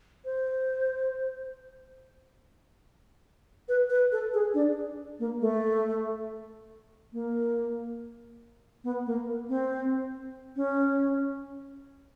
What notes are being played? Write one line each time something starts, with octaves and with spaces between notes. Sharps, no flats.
C5
B4
B4
A4
G#4
D4
A#3
A3
A#3
B3
A#3
C4
C#4